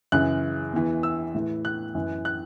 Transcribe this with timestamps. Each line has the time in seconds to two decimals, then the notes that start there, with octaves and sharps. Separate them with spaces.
0.12 F#2 C#3 E3 F#6
0.73 E2 E3
1.03 E6
1.34 A2 E3
1.65 F#6
1.95 F#2 E3
2.25 F#6